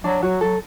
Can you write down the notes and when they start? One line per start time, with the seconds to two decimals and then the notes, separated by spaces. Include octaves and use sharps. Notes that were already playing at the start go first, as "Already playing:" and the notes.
0.04 F#3 D4
0.22 F#3 F#4
0.41 F#3 A4